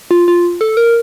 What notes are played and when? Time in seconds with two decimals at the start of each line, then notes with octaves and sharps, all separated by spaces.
0.11 F4
0.28 F4
0.61 A4
0.77 A#4